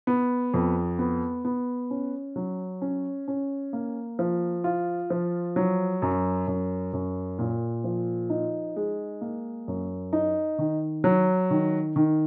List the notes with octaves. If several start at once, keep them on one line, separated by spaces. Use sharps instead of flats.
B3
F2
B3
B3
C#4
F#3
C#4
C#4
A#3
F3
F4
F3
F#3
F#2
F#2
F#2
A#2
F3
D#4
G#3
A#3
F#2
D#4
D#3
F#3
D#3
D#3